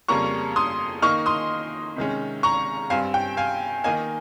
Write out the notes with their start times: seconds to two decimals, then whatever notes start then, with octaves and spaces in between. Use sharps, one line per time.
0.08 F2 C#3 G3 A#3 C#4 A#5 C#6
0.56 C6 D#6
1.02 D#3 A#3 D#4 C#6 F6
1.26 C6 D#6
1.96 C3 D#3 G#3 C#4
2.43 A#5 C#6
2.90 G2 G3 C4 F5 G#5
3.14 G5
3.37 F5 G#5
3.84 D#3 A#3 D#4 F5 G#5